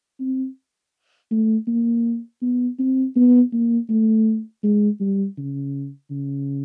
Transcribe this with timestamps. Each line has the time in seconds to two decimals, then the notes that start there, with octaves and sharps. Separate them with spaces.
0.20 C4
1.31 A3
1.68 A#3
2.42 B3
2.79 C4
3.16 B3
3.53 A#3
3.89 A3
4.64 G#3
5.00 G3
5.38 C#3
6.11 C#3